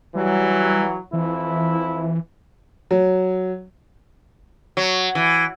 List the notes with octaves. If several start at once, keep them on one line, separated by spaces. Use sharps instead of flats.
E3 F#3 G3
F2 E3 E4
F#3
F#3
E3